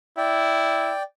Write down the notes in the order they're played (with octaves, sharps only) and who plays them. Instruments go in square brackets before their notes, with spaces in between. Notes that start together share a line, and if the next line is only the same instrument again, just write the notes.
[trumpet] E4 [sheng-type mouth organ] D5 G5